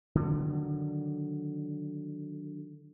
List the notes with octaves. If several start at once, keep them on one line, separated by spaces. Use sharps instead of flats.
D3 D#3 F#3